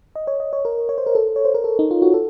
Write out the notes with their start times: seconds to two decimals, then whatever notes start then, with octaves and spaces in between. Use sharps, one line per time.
0.16 D#5
0.27 C#5
0.40 D#5
0.53 C#5
0.65 A#4
0.89 C#5
0.98 C5
1.06 A#4
1.15 A4
1.36 C#5
1.45 C5
1.54 A#4
1.64 A4
1.79 D#4
1.91 F4
2.02 F#4
2.14 A4